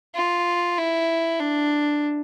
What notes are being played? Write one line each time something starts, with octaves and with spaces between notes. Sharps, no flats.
F4
E4
D4